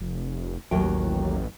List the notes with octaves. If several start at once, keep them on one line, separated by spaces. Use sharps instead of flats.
F1
A1 D#2 F#3 G5